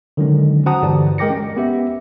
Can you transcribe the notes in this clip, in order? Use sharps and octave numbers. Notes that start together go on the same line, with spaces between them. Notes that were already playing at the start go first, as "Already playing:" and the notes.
D3 D#3 F#3 G#3 C#4
F#4 C5 F#5 A5 A#5 D#6
G2 D3 E3 G4 D5
G#3 A#4 G5 D6 A#6 C#7
C#4
B3 G4 E5